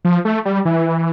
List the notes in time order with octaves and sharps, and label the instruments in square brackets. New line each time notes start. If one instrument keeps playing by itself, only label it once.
[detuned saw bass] F3
A3
G3
E3